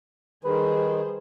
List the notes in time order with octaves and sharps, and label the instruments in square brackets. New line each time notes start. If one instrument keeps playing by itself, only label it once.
[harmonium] D#3 [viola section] G3 G#4 C5 [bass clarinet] B4